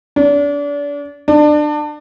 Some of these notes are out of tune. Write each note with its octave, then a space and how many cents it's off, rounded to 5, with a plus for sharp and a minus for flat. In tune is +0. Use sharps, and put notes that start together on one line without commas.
D4 -35
D4 +25